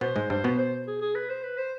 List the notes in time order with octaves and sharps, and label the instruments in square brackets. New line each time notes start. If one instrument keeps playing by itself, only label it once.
[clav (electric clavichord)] B2 B3 [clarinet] C5
[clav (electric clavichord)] G#2 G#3
[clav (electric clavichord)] G2 G3 [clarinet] C5
[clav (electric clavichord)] B2 B3
[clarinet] C5
G#4
G#4
B4
C5
B4
C5